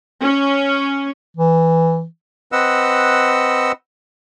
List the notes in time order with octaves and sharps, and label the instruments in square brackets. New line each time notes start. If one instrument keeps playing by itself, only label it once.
[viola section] C#4
[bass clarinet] E3
[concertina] C4 B4 D#5 F#5 E6